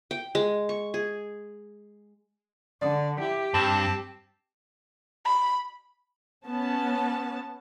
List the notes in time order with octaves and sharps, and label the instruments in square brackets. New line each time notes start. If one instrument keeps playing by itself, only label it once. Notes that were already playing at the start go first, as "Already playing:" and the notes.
[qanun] G5
G#3
C#6
G#4
[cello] D3 [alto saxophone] D5
[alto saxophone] E4 [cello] G4
[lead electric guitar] G2 [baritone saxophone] C4 [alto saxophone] A5
[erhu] B5
[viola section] B3 C#4 A5